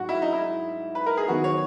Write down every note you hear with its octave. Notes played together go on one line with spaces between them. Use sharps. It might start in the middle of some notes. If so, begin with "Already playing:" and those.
Already playing: G#2 F#3 F#4
E4
D#4
E4
B4
A#4
G#4
D#3 F#3 B3 F#4
C#5